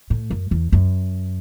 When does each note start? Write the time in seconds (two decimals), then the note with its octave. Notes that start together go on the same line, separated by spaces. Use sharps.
0.10 A2
0.30 F#2
0.51 E2
0.72 F#2